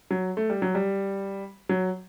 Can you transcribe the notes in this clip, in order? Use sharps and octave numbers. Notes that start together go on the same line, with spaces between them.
F#3
A3
G3
F#3
G3
F#3